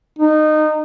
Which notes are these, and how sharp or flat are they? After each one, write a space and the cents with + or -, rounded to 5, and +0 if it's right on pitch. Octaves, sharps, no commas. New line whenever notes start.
D#4 -20